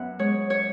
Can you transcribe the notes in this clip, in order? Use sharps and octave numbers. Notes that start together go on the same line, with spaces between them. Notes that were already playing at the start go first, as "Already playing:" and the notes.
Already playing: F#2 B3 E5 F#5
G#3 C#5
C#5